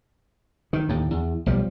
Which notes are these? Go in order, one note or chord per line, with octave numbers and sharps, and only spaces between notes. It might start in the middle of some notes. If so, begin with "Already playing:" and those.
D#3
D#2 A2
E2
B1 F3 G3